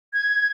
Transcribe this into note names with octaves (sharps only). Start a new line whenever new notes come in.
G#6